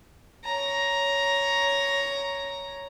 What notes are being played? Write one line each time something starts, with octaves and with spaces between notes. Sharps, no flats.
C#5 A#5